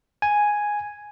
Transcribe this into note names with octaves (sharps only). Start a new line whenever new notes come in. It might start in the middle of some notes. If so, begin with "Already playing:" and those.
G#5